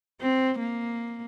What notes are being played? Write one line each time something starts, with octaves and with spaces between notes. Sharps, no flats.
C4
A#3